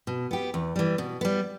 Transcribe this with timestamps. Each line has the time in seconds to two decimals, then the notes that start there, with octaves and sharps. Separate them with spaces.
0.07 B2
0.31 B3 G4
0.54 E2
0.76 E3 G3
0.98 B2
1.21 G3 B3